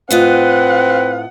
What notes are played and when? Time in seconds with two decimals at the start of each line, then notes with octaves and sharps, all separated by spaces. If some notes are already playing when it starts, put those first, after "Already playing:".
0.11 A2 C4 F4 B4 D#5 F#5